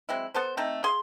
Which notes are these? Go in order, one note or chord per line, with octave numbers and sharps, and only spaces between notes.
F#3 G#3 C4 E4
B3 A4 C5
A3 C4 D#4 A4
G#4 F5 C6